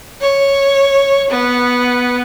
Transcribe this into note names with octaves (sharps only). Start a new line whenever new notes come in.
C#5
B3